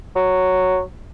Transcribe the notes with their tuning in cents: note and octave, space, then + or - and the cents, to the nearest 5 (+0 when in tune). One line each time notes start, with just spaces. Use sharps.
F#3 +0